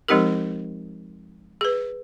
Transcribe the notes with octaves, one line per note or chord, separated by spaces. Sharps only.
F3 G#3 C4 D#4 G4 A#4
G#4 B4